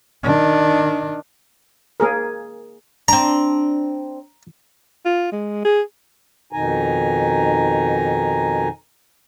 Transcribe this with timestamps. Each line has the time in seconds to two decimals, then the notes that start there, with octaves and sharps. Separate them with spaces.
0.23 D#3 D4
2.00 A#3 G#4 A#4
3.08 C4 D4 A#5
5.06 F4
5.32 G#3
5.65 G#4
6.53 F2 B2 D#3 D#4 G#5 A#5